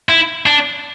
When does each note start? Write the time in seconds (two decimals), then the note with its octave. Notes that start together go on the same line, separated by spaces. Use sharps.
0.09 E4
0.46 D4